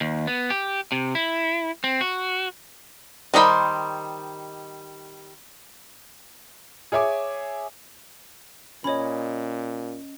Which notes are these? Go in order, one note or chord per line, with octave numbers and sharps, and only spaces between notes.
D#2
B3
G4
C3
E4
C4
F#4
D#3 G3 D#4 C5 B5
G#4 C#5 E5 G#5 D6
A#2 C#4 C#5 D#5 B5